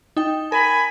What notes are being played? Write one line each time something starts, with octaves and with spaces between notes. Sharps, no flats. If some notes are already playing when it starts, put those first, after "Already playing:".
D#4 G5
A#4 G#5 B5